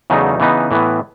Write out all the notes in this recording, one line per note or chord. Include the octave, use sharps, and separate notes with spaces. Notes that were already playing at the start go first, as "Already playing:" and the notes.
E2 C#3 F#3 A3 D#4
C#3 E3 B3 D#4
A2 E3 B3